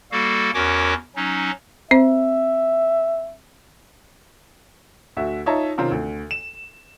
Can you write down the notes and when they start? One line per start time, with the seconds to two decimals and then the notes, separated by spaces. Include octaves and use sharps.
0.12 G3 A#3 F#4 A4 F5
0.54 E2 C#4 F#4 A#4 C#5 D6
1.16 F#3 C#4 D#4
1.91 C4 C5 E5
5.17 D2 F#4 E5
5.46 D#4 F4 C#5 E5 A5 A#5
5.78 C3 D#3 C4 C#4 F4 A#4
5.91 D2
6.31 E7